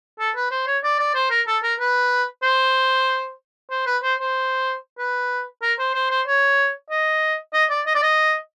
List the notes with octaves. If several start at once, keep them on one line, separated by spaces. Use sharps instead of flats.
A4
B4
C5
C#5
D5
D5
C5
A#4
A4
A#4
B4
C5
C5
B4
C5
C5
B4
A#4
C5
C5
C5
C#5
D#5
D#5
D5
D#5
D5
D#5